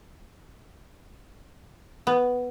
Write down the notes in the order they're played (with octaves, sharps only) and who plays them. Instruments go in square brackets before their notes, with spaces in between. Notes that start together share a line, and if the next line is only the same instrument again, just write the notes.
[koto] B3